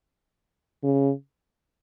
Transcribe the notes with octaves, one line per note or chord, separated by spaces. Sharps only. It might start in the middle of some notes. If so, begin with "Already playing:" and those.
C#3